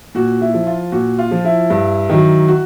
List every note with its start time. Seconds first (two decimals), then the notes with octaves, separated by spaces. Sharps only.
0.15 A#2 F#4
0.41 E4
0.54 F3
0.67 F4
0.92 A#2 F#4
1.19 F4
1.31 F3
1.45 E4
1.70 G2
2.09 D#3 F#3
2.48 F#4